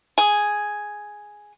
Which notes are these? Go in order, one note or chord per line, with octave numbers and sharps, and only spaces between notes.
G#4